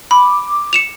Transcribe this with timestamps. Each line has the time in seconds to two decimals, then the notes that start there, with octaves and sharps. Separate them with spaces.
0.11 B5 D6
0.73 C#7 E7 F7